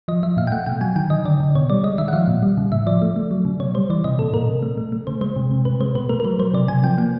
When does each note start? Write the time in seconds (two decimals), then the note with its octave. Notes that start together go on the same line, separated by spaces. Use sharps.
0.08 F3 D#5
0.23 F3 E5
0.37 A#2 F5
0.47 G5
0.52 A3 F#5
0.66 B2 G5
0.81 F#3 G#5
0.96 D#3 G5
1.10 D#3 D#5
1.25 D3 D5
1.40 D3
1.55 B2 C#5
1.70 G3 D5
1.84 G#3 D#5
1.98 D#3 E5
2.08 F#5
2.13 F3 F5
2.28 A#2
2.43 G3
2.58 C#3
2.72 A2 E5
2.86 F3 D5
3.02 A3
3.16 A3
3.31 F#3
3.45 C#3
3.60 B2 C#5
3.74 G3 C5
3.90 E3 D5
4.04 C3 D#5
4.19 A#2 A4
4.33 A#2 A#4
4.48 C3
4.63 A3
4.78 A3
4.92 A3
5.07 C#3 C5
5.21 G#3 C5
5.36 C3
5.52 C3
5.65 C3 B4
5.81 G#3 C5
5.95 B2 B4
6.09 A3 A#4
6.20 A#4
6.25 F#3 B4
6.39 F#3 C5
6.53 C3 D5
6.68 C3 G#5
6.84 F3 G5
6.98 A#3 G5